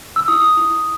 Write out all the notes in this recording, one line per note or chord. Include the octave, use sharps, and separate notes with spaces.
E6
E4 D#6
E4